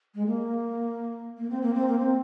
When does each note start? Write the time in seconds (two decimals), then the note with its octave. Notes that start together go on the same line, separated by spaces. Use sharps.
0.15 G#3
0.26 A#3
1.37 A#3
1.50 C4
1.62 A#3
1.74 C4
1.87 A#3
1.99 C4